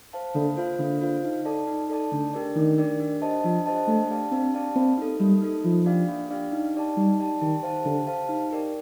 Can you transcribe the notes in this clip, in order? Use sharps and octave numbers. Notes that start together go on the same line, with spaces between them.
C5 F5 A5
D3 A#3
F4 C5 F5
D3 A#3
F4 C5 F5
D#4
A4 D5 A5
D#4
A4 D5 A5
D3 A3
D4 G4 A#4 D5
D#3 A3
D4 G4 A#4 D5
D4
G4 C5 D#5 A5
F3 D4
G4 C5 D#5 A5
A3 D4
G4 D5 F5 A5
C4 D4
G4 D5 F5 A5
A#3 C4
D#4 A4
G3 A#3
D#4 A4
F3 A#3
D4 G4 D5 F5
A#3
D4 G4 D5 F5
D#4
G4 D5 A5
G3 D#4
G4 D5 A5
D#3 G4
C5 F5 A5
D3 G4
C5 F5 A5
D#4
G4 A#4 D5